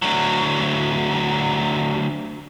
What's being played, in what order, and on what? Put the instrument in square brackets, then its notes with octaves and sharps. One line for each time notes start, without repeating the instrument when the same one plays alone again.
[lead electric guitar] D2 F#3